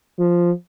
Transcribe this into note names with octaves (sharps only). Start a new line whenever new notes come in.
F3